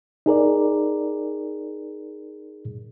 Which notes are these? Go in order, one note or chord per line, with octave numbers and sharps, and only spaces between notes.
D#4 G#4 A#4 D5